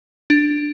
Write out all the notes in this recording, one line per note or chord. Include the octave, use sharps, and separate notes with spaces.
D4